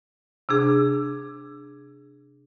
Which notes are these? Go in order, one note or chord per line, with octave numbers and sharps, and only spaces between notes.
C3 D4 G#4